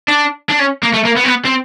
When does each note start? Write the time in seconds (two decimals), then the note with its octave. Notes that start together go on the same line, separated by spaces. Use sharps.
0.08 D4
0.49 D4
0.59 C#4
0.83 A#3
0.94 A3
1.05 A#3
1.16 B3
1.24 C4
1.28 B3
1.45 C4